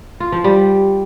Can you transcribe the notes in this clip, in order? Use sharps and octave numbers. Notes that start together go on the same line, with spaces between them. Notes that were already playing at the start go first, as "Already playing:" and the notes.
F4
F3
G3